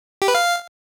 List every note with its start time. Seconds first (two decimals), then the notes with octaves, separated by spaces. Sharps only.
0.22 G4
0.28 B4
0.35 F5